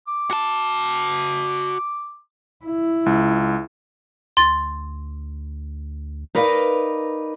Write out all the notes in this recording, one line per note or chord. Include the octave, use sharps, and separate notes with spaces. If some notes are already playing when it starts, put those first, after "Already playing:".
D6
F#4 A5
E4
C#2
D2 C6 A6
D#4 A#4 B4 D5 D#5 F5